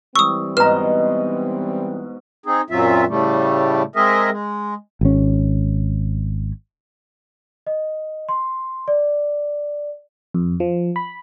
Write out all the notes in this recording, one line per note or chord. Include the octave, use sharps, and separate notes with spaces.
E3 G3 C4 C#6 D#6 E6
G#2 B2 B4 D#5 A#5 F6
C4 D#4 G#4
F#2 A#2 F#3 C4 F4 E5
A2 C#3 G3 A3
G#3 C4 G#4 A#4 D#5 E5
G#3
G#1 C#4
D#5
C6
D5
F2
F3
B5